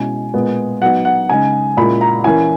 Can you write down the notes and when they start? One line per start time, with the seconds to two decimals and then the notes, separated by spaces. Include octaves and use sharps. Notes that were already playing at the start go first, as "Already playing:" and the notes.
Already playing: B2 G#3 C#4 E4 G#5
0.34 A#2 G#3 B3
0.82 F#3 B3 D#4 F#5
1.05 F#5
1.29 C#3 G#3 D#4 G#5
1.77 A#2 G#3 C#4 E4 B5
2.01 A#5
2.24 E3 A#3 C#4 E4 G#5